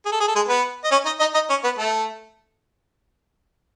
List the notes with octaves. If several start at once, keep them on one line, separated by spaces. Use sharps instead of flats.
G#4
A4
G#4
A4
G#3 G#4
B3 B4
D#5
C#4 C#5
D#4 D#5
D#4 D#5
D#4 D#5
C#4 C#5
B3 B4
A3 A4